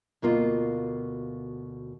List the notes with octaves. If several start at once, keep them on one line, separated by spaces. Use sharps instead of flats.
D2 B2 A#3 F4